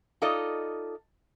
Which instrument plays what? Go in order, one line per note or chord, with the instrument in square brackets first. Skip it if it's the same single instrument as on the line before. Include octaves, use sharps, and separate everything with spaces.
[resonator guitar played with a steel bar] D#4 F4 A4 D5 D#5